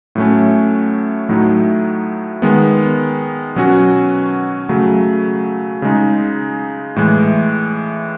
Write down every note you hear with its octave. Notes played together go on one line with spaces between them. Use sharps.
A2 F#3 A3 C#4
A2 F#3 A3 D#4
D#3 G#3 B3
B2 F#3 C#4 F#4
C#3 F#3 A3
C#3 G#3 D#4
A2 E3 G#3